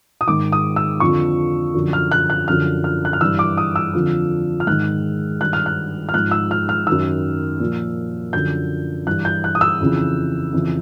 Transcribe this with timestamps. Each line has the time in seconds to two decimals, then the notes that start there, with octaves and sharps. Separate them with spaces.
0.21 D#6
0.27 G#2 D#3 D6
0.52 D#6
0.76 E6
1.00 F2 D3 F3 C#6
1.74 F#2 D3 F3
1.93 F6
2.11 F#6
2.30 F#6
2.47 F#2 D3 F3 F6
2.84 F6
3.05 F#6
3.13 F6
3.21 G2 E3 E6
3.39 D6
3.58 D#6
3.76 E6
3.93 F2 D3 F3
4.60 F6
4.67 G#2 D#3 F#6
5.41 G2 D#3 F#6
5.53 F6
5.66 F#6
6.09 F6
6.14 G#2 F3 F#6
6.31 E6
6.51 F6
6.69 F6
6.87 F#2 D#3 E6
7.60 A#2 F3
8.33 F#2 D3 F3 G6
9.07 G2 E3 F#6
9.25 G6
9.44 F#6
9.55 D#6
9.61 E6
9.80 F2 C#3 E3
10.53 F2 C#3 E3